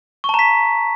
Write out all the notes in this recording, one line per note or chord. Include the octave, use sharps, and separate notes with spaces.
A5 A#5 C#6 B6